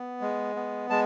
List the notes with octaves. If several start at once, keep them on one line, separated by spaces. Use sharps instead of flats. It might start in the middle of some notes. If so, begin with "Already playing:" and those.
Already playing: B3
G#3
B3
G#3 A5